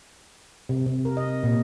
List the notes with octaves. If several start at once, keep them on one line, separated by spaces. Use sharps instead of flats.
C3
C3
A#4
D#5
A#2